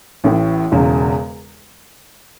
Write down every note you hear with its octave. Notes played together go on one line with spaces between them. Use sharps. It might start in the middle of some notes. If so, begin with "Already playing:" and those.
A1 A2 E3
E1 E2 C#3